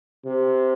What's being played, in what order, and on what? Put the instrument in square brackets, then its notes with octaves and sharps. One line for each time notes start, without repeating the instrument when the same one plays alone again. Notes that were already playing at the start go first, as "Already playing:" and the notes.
[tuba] C3